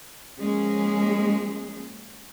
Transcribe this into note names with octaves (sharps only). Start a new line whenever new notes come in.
F3 G#3 A#3 C#4 G#4